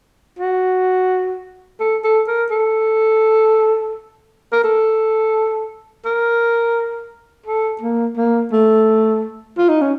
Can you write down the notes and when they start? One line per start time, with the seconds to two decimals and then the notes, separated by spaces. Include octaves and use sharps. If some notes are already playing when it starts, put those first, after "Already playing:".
0.39 F#4
1.80 A4
2.04 A4
2.28 A#4
2.51 A4
4.52 A#4
4.64 A4
6.05 A#4
7.46 A4
7.81 A#3
8.17 A#3
8.52 A3
9.58 F4
9.69 D#4
9.81 C#4